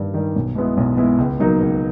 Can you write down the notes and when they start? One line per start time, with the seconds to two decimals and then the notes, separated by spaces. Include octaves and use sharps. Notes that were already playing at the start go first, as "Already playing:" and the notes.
Already playing: G2 D#3 G3
0.14 D#3 G3
0.36 B1
0.55 B2 G#3 B3 E4
0.77 B1
0.97 B2 G#3 B3 E4
1.18 C#2
1.39 B2 F#3 A#3 D#4
1.61 C#2